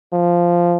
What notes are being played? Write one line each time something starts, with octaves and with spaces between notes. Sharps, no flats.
F3